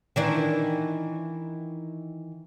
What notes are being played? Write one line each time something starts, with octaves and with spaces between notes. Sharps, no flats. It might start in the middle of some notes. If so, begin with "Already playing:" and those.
D#3 E3 D4